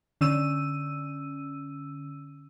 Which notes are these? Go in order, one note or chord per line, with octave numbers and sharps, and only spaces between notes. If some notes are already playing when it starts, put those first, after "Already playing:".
D3 C#4 E6 D#7